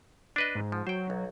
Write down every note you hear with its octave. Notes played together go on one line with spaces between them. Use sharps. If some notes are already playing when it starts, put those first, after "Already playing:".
D4 B4 D#5
G#2
F3
F#3 C5 G5
B1